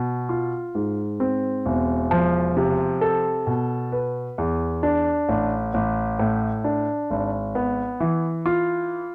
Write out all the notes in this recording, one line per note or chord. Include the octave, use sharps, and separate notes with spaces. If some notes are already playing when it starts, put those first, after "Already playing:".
Already playing: B2
F4
G#2
C4
E1
F3
C3
A4
B2
B4
E2
D4
A1
A1
A2
D4
G#1
B3
E3
F4